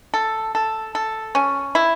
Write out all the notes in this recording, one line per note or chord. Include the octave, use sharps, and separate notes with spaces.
A4
A4
A4
C#4
E4